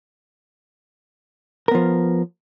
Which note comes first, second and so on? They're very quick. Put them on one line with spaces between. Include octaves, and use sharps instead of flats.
A#4 B3 F3